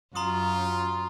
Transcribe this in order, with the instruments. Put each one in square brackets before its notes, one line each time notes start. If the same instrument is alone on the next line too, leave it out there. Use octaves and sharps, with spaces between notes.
[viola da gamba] F#2 [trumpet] F4 [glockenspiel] A#5 C6 D#6